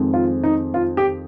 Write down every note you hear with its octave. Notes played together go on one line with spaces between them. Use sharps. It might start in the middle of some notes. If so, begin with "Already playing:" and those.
Already playing: F2 D#3 G#3 C4
F4
D#4
F4
G4